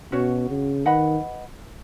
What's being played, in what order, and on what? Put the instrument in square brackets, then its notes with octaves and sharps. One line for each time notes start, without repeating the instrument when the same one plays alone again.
[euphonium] B2 [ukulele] C#4 F#4 C#5
[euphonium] C#3
[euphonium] D#3 [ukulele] B4 D#5 F#5 B5